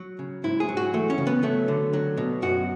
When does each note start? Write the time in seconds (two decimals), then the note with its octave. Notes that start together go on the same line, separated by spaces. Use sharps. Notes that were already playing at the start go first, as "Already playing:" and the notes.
Already playing: F#3
0.19 C#3
0.44 G#2 E4
0.60 G#4
0.69 F#3
0.77 F#4
0.93 E3 A3
1.10 C#4
1.18 C#3
1.27 B3
1.43 F#3 A3
1.68 D3
1.93 F#3
2.17 B2
2.42 F#2 F#4